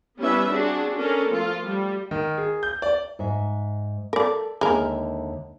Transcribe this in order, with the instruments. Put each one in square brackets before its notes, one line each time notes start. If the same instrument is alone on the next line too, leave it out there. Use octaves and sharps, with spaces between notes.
[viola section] G3 B3 C#4 E4 B4 E5
C4 D4 F#4 G#4
C#4 D4 A4 A#4
F3 A3 F4
G3
[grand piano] D#3
G#4
G6
D5
[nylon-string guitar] G#2 E5
[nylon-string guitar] A4 [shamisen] A#4 D5
[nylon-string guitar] D#2 D3 E5 [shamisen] G#3 A#4